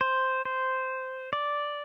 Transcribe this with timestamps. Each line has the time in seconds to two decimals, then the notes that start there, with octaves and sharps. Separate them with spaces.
0.01 C5
0.45 C5
1.33 D5